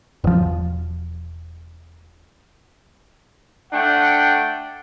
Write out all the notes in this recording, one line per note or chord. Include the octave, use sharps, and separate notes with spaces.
E1 F3
A3 D4 F#5 G5